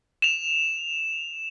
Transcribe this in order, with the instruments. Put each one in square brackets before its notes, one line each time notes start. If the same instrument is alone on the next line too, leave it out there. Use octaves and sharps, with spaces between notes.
[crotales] E7 F7